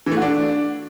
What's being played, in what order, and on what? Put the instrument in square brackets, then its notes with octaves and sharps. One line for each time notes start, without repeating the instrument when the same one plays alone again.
[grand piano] E3
A3
F#4
D4